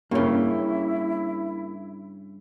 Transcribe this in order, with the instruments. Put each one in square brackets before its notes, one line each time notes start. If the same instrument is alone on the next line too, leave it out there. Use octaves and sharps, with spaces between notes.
[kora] G2 C#3 [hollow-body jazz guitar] A#3 C#5 [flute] E4